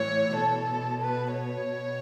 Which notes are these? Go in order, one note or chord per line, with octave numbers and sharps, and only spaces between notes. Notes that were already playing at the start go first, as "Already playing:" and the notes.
Already playing: A2 E3 C#5
B2 A4
B4
C#5
B2